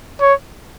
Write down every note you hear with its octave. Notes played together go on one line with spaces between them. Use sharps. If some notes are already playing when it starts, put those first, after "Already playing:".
C#5